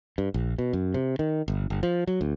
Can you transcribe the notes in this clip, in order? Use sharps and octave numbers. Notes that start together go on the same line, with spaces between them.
G2
A#1
B2
F#2
C3
D#3
G1
G1
F3
F#3
D2